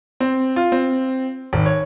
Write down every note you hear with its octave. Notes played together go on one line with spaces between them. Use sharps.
C4
F4
C4
G#1
C#5